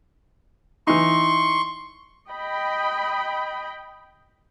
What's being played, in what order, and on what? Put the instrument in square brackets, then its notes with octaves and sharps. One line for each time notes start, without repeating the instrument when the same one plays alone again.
[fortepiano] E3 D#4 [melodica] C6 C#6
[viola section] D#5 G5 B5